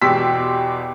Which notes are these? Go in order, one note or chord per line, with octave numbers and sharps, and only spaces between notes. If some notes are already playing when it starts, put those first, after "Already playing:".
E2 B2 G4 C6 E6 B6